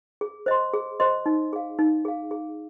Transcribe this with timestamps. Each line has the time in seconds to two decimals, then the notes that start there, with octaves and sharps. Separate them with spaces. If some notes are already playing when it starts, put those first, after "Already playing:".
0.21 G#4
0.46 C5 D#5 C6
0.74 G#4
1.00 C5 D#5 C6
1.26 D#4
1.53 G#4 F5
1.79 D#4
2.05 G#4 F5
2.31 G#4